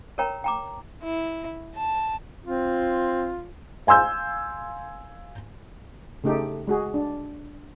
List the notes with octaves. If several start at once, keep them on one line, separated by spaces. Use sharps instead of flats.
A4 A#4 C#5 G5 A#5
G5 A#5 D6
E4
A5
C4 F4
F5 G#5 C6 E6 G6
C#3 A3 D#4 G4 A4
G#3 F#4 G#4
D4